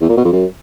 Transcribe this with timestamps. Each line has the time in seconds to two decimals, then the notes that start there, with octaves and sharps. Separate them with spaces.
0.01 E2
0.09 A#2
0.17 B2
0.25 F2
0.33 F#2